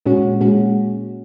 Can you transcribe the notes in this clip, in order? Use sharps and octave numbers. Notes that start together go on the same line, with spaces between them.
A#2 G#3 C#4 F#4
A#2 G#3 C#4 F#4